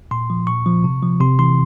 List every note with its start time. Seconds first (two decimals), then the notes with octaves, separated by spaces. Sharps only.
0.11 A#2 C6
0.30 F3
0.47 A#2 C#6
0.66 F3
0.84 C3
1.02 F3
1.20 C3 C6
1.39 E3 C6